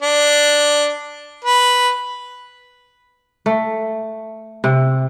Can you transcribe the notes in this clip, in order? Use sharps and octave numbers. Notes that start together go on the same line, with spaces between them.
D4
B4
A3
C3